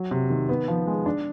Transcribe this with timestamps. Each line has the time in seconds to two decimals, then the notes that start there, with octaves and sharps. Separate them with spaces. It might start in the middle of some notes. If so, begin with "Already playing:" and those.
Already playing: F#3
0.11 C3
0.30 D#3
0.49 B3
0.68 F3
0.87 G#3
1.06 D4